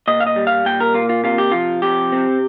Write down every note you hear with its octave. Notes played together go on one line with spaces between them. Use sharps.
A#2 D#5
F5
D#5
G3
F5
A#2 G5
A#4
A#3 F4
F4
C3 F4
G4
F3 F4
C3 G4
C4